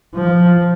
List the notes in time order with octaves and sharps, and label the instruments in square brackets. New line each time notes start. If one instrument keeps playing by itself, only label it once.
[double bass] F3